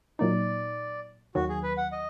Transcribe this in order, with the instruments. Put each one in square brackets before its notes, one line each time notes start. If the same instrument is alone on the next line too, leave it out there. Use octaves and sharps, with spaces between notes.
[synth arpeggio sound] A#2 F#3 A#3 D#4 [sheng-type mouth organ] D5
[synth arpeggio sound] D#2 D#3 F#3 [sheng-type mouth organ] F#4
[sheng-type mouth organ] G#4
B4
F#5
D#5